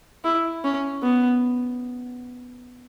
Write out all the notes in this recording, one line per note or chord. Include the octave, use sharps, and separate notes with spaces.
E4
C#4
B3